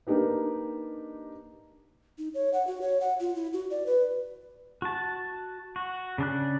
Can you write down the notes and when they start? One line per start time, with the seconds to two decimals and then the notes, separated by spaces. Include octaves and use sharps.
0.07 A#3 D4 D#4 G4 B4
2.18 D#4
2.34 C#5
2.54 F#5
2.67 F#4
2.81 C#5
3.01 F#5
3.20 F4
3.35 E4
3.53 F#4
3.71 D5
3.86 B4
4.82 F#4 A5
5.76 F#4
6.18 C#3 D4 F#6